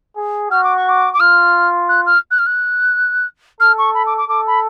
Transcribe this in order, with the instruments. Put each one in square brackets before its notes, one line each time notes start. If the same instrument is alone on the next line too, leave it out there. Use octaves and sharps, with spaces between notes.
[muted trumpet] G#4
[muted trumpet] F#4 [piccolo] F6
[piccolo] D6
C#6
D6
D6
[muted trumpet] F4 [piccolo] F6
[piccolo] F#6
F6
F#6
F6
F#6
[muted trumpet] A4 [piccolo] F6
[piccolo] C#6
B5
D6
D6
[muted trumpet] A4 [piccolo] D6
[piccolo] B5